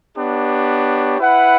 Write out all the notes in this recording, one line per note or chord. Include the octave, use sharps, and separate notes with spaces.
B3 D4 G4 C#5
E4 B4 F#5